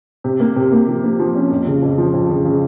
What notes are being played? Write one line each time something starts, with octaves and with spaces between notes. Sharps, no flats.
C3
A#3
C3
A#3
F3
A#3
F3
C#4
F2
C#3
F2
F3
F2
C#3
C#3